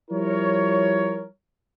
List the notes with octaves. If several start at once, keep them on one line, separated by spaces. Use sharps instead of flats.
F3 G3 E4 A#4 C#5